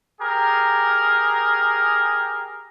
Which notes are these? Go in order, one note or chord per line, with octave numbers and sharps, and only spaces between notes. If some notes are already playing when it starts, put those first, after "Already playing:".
G4 G#4 A#4